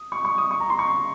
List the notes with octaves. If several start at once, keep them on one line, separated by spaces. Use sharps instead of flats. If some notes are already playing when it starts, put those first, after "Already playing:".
Already playing: D#6
C#6
C#6
D#6
C#6
A#5
C6
C#6